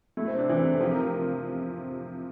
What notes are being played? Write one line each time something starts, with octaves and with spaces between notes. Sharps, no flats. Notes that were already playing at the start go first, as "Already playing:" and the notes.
A3 E4
C4
C3
D4
E3
C3
A4
F3 G4
A#4
A#4